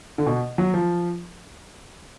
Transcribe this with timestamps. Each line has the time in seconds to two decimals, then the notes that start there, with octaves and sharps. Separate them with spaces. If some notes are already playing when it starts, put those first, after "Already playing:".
0.18 D3
0.26 B2
0.58 F#3
0.74 F3